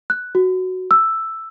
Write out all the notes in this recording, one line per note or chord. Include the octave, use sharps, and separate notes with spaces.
F#6
F#4
E6